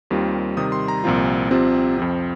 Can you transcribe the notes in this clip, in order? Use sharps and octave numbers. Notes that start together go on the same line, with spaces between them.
D#2 D#3 G3 C4 F4
C3 D#3 G3 D#6
C6
A#5
C2 A#2 F3 C4 F4
C2 C3 F3 C4 F4
F2 F3 C4